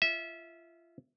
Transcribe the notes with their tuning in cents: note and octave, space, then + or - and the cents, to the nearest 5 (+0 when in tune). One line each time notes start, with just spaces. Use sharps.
F4 -30 E5 -20